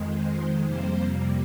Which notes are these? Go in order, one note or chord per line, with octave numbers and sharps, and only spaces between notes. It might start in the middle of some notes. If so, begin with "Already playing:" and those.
Already playing: F2 D#3 G#3
C5
F2 C3 G3 A#3 C5